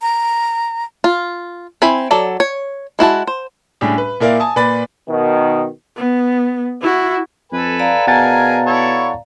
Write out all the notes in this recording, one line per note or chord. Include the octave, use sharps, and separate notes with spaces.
A#5
F4
C4 E4 G#5 B5
F#3 A4 D5
C#5
G#3 E4 F#4 A5
C5
A2 G3 C#4 D4 G4 G#4
B4
A#2 E4 A#4 D5 F5
G#5 A5 D#6
A#2 B4 D5 B5 A6
B2 D#3
B3
E4 F#4
F2 A4 B4 G#5
D5 F5 A#5
B2 G#4 A#4 F#5 G#5 A5 A6
E4 A4 C#5